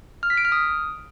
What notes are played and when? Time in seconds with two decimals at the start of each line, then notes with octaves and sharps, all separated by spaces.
0.23 F6
0.30 B6
0.37 D7
0.45 F6
0.52 D#6